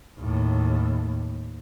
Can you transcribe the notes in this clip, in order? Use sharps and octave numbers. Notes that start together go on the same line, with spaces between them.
D#2 A2